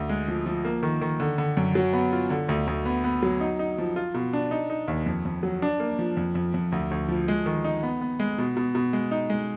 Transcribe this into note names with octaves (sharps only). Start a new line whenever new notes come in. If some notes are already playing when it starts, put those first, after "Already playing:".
Already playing: D2
G#3
F3
F3
A#3
D#3
D#3
D3
D3
F#2
F#3
B3
F4
D3
D2
D2
B3
B3
F#3
D#4
D#4
F3
F4
B2
D4
D#4
D#4
D#2
F2
F2
F#3
D4
A#3
F3
F2
F2
F2
D2
D2
F3
G#3
D#3
D#4
B3
B3
G#3
B2
B2
B2
G#3
D#4
G#3